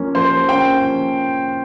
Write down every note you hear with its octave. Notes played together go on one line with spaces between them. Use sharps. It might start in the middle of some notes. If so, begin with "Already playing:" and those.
Already playing: F3 A#3 C#4
F3 C5
A#3 C#4 G5
F3